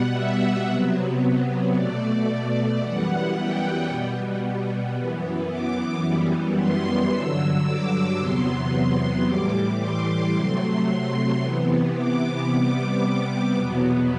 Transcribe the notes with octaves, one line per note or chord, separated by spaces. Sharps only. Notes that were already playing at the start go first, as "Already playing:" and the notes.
Already playing: B2 G3 B3 F#5
E5
C3 F#3 B3
B2 A3 D5
F#2 E3 G3 B3 F#5
G5
B2 G3 B3
F#2 E3 B3
D6
F#2 E3 G3 B3
C6
G2 D3 F#3 E6
D6
E2 C3 F#3 B3 C6
A2 E3 G3 D6
C6
C3 F#3 A3 C6
C6
C3 E3 B3
D6
C3 G3 B3 D6
E2 B2 F#3 B3